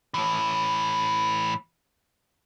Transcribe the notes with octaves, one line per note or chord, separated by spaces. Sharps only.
A2 E3